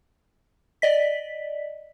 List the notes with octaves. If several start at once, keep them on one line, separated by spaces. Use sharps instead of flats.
D5 D#5 B6